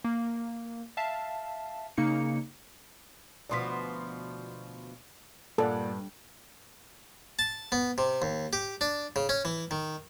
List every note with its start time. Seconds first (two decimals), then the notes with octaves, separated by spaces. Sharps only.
0.04 A#3
0.97 E5 F5 A5
1.97 C#3 A#3 D#4 C#7
3.49 D2 B2 F3 D5 C6 B6
5.58 G2 A#2 A4 D5 F#5
7.39 A5
7.72 B3
7.98 C3
8.22 D#2
8.53 G4
8.81 D4
9.16 C#3
9.29 C#4
9.45 E3
9.71 D#3